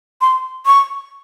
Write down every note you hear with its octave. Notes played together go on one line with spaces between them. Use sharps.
C6
C#6